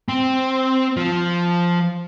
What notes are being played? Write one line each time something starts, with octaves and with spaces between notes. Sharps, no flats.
C4
F3